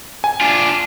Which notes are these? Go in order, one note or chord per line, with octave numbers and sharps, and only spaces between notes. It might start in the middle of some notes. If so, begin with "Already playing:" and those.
G#5
D4 F4